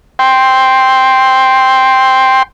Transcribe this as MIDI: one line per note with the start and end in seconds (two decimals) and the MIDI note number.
0.19 2.43 79
0.19 2.43 84